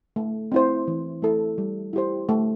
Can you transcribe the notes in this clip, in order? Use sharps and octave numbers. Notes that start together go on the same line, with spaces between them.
A3
C4 E4 C5
E3
A3 E4 A4
G3
E4 G4 C5
A3